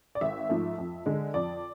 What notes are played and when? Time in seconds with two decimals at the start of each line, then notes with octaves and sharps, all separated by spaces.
0.15 D5
0.21 G#1 E5
0.49 G#2 F3 A3
0.78 F2
1.06 D3 G#3
1.34 F2 D5